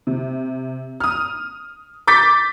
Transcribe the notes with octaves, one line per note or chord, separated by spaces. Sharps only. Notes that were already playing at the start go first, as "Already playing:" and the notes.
C3
D#6 F6
D6 G6 A6 B6